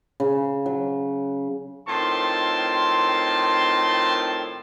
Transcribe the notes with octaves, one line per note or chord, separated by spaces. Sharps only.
C#3
F#3
A2 D#3 C4 F4 A5 C6